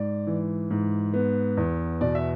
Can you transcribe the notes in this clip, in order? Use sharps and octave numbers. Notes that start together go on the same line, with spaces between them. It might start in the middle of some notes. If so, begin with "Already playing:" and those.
Already playing: G#2 D5
E3
G#2
B3
E2
B2 D5
E5